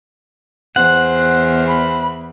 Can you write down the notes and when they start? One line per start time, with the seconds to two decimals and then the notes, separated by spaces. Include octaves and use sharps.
0.76 E2 C5 F#5
1.68 B5